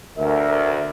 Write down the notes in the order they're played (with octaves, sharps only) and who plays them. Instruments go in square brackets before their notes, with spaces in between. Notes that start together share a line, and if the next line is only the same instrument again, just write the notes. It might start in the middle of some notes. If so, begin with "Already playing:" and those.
[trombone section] D2 [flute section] A#4 [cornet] E5